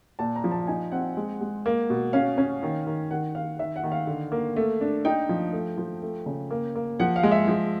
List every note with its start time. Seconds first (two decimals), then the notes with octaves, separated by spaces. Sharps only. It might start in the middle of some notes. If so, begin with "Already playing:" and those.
0.19 A#2 A5
0.36 A#5
0.44 F3
0.51 A5
0.67 D#4 G#5
0.92 C4 F#5
1.17 G#3
1.41 G#3
1.66 A#3
1.90 B2
2.13 C#4 F5
2.38 C#4
2.63 D#3
2.86 D#3
3.11 D#3 F#5
3.35 D#3 F5
3.59 D#3 E5
3.76 F#5
3.83 D#3
3.92 F5
4.07 D3
4.32 A#3
4.56 A3
4.81 D4
5.05 D#4 G5
5.29 F3
5.53 A3
5.78 F3
6.03 A3
6.26 C#3
6.51 A#3
6.75 A#3
7.00 F3 F#5
7.16 F5
7.23 G#3
7.32 E5
7.48 F3